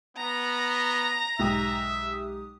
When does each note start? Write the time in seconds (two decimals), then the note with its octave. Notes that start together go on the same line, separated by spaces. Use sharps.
0.17 B3 A#5
1.39 B1 G#2 G4 E5 D#6